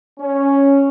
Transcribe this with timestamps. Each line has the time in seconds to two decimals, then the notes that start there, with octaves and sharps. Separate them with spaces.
0.19 C#4